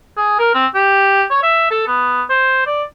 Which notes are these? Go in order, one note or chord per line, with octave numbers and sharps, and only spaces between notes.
G#4
A#4
C4
G4
C#5
E5
A4
B3
C5
D5